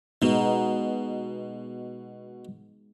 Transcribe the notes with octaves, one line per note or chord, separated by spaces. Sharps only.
B2 G#3 B3 D#4